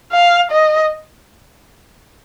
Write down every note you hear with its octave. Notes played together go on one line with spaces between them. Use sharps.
F5
D#5